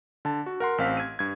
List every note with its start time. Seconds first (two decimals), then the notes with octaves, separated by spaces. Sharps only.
0.25 D3 A5
0.46 F#4
0.60 A#4 F#5 C6
0.78 A1 C4 F5 F6 B6
0.97 G#6 D#7
1.19 G2 G#6